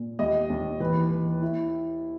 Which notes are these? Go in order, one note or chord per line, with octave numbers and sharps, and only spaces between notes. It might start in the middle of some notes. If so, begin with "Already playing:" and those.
Already playing: A#2
D#2 D#5
D#2
E3 B4
E3
E4